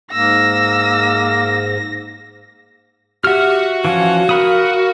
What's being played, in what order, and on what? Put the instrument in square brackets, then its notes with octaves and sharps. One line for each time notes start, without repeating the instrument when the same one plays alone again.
[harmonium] G#2 [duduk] A#3 [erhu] E6 [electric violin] A#6
[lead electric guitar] F#4 F#5 [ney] G4 [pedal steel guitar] E5 F6
[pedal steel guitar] E3 F3 C#4 [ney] F5
[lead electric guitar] F#4 [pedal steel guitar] A#4 B5 D#6